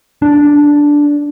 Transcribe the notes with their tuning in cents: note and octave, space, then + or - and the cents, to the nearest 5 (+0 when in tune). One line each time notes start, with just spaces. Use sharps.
D4 -5